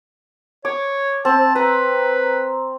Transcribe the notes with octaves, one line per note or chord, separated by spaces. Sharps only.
C#5 D6
C4 A5
B4 A#5